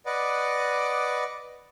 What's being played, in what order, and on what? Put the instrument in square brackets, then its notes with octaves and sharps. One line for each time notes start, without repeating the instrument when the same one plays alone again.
[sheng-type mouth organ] B4 D5 D#5 F#5 D6